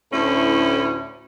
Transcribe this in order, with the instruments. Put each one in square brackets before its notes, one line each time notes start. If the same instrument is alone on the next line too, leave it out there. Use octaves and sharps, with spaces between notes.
[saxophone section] D2 A2 C#4 E4